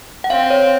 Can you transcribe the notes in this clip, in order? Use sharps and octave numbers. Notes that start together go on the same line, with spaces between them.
F#5
C4 F5
C#5